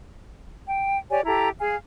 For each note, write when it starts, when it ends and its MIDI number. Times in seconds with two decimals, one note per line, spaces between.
0.68 0.96 79
1.09 1.20 67
1.09 1.20 73
1.09 1.20 74
1.09 1.20 80
1.25 1.49 64
1.25 1.49 67
1.25 1.49 69
1.25 1.49 82
1.59 1.76 68
1.59 1.76 77
1.59 1.76 80